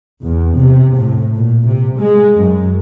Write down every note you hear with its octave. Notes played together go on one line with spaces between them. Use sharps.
E2
C3
A2
A#2
C3
G#3
F#2